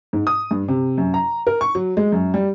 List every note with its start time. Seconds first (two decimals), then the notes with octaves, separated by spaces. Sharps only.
0.13 G#2
0.27 D#6
0.51 G2
0.68 C3
0.98 F#2
1.14 A#5
1.47 A#4
1.61 C#6
1.75 F#3
1.97 G#3
2.12 F#2
2.34 G3